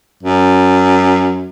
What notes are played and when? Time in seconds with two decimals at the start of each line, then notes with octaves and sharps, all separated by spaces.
0.23 F#2